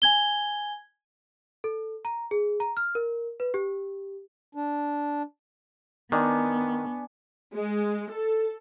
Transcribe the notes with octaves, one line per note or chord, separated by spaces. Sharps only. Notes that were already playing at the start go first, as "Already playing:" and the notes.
G#5 G#6 G7
A4
A#5
G#4
A#5
F6
A#4
B4
G4
D4
D#3 B3 D4 G#5 C#6
G#3
A4